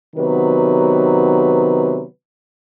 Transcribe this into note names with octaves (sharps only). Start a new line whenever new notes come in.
C3 D#3 F#3 B3 B4